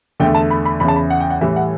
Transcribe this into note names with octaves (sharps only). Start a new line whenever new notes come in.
E2 D3 A3 G5
A5
B5
B5
E2 C#3 E3 B5
A5
B5
F#5
G5
F#5
A2 E3 G3 E5
F#5